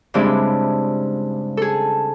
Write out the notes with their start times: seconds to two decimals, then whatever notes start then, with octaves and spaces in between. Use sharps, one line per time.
0.14 G2 C#3 G#3 C4 D4 E4
1.57 G#4 A4